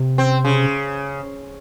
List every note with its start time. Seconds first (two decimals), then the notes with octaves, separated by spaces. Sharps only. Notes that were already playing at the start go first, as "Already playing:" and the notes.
Already playing: C3
0.18 C4
0.45 C#3